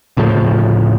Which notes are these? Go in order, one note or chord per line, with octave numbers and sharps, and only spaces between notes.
D1 A2 C#3 F3